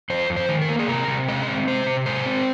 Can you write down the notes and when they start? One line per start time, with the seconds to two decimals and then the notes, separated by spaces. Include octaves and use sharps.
0.10 F2 C5
0.30 F2
0.36 C5
0.49 D#3
0.62 A#4
0.69 A#3
0.79 G#4
0.88 C3 A#4
1.08 C3
1.28 G#3 D#5
1.47 C4
1.67 C3 C5
1.86 C3
2.06 G#3 C5
2.26 C4